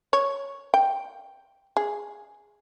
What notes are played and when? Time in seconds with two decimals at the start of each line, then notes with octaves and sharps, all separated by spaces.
0.13 C#5
0.74 G5
1.77 G#4